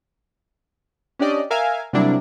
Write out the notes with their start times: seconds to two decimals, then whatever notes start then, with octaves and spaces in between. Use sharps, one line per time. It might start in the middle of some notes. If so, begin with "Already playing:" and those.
1.19 C#4 D4 G4 D5 D#5
1.50 A#4 E5 F5 G#5
1.93 C3 F#3 G3 A#3 D4 E4